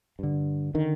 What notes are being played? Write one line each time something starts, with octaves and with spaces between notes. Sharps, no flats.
G2 D3
D3 D#3